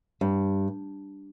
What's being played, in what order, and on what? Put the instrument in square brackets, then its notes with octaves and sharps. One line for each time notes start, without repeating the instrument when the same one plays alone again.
[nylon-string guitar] G2